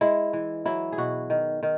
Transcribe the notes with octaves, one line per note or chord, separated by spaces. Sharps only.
G#3 E4
E3
F#3 E4
G#4
B2 F#4
D#3
D#3